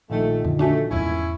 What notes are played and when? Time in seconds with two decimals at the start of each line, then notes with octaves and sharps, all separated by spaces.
0.10 A#1 A#2 D#3 A3
0.45 F2 D3
0.59 A3 D4 F#4 G#5
0.91 E2 G#2 B2 C#4 E4